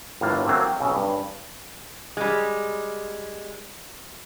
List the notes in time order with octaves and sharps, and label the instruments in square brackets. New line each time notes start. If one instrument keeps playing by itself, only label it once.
[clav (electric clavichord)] G1 A2 A#3 F5 A5
F#3 A3 A#3 C4
G5
B1 C#3 E5 A#5
G2
[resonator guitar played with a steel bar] G3 G#3